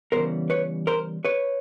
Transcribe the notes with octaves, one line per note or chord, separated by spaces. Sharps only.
C#3 E3 G3 B3 A#4 C5
B4 C#5
A#4 C5
B4 C#5